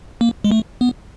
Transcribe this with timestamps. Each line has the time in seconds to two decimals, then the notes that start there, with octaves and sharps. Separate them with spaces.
0.21 A#3
0.44 G#3
0.51 A3
0.81 B3